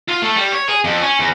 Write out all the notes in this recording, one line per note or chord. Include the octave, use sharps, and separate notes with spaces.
F4
A3
G3
C#5
G#4
F2
C#4
E2